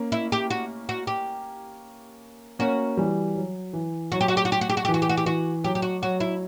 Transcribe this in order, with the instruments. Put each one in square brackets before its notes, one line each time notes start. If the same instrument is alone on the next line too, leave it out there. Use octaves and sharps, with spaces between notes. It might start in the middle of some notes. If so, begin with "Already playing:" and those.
Already playing: [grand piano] A#3 C#4
[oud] E4
G4
F#4
F#4
G4
[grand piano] A#3 C#4 [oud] F#4
[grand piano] E3 G3
F#3
E3
[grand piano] F#3 [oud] F#4
[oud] G4
F#4
G4
F#4
G4
F#4
G4
F#4
G4
[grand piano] E3
[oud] F#4
G4
F#4
G4
[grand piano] E3 [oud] F#4
[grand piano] F#3 [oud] G4
[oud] G4
F#4
[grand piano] F#3 [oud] F#4
[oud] E4